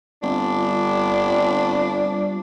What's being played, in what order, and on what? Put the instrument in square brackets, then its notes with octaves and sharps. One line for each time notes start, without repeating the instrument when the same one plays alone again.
[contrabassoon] G1 [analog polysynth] G3 C4 F4 [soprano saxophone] D4